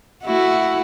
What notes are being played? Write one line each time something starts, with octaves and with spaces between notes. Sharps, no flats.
A3 E4 F#4